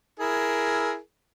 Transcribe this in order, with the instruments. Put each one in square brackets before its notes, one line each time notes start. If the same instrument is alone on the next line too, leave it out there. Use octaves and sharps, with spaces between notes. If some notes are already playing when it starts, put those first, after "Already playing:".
[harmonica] E4 G#4 A#4